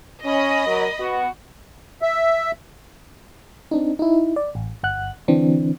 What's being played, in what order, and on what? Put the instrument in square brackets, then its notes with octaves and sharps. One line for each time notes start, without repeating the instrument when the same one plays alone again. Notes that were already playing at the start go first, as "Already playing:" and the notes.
[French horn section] C#4 [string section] D#5 B5
[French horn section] F#3 A#4
B3 F#4
[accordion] E5
[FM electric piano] C4 D4 D#4
D#4 E4
D5
A1
G1 F#5 F#6
D3 E3 C4 D4